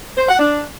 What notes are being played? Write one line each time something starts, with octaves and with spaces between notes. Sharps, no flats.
C5
F#5
D4